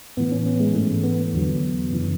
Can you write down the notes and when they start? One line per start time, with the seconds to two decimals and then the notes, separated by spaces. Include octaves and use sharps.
0.17 A2 E3 B3
0.32 C#4
0.46 B3
0.60 G#3
0.74 G#2 E3 A3
1.03 B3
1.33 E2 D3 F#3
1.91 F#2 C#3 E3